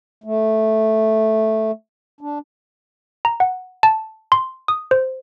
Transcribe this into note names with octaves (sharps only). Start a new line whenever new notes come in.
A3
D4
A#5
F#5
A5
C6
D#6
C5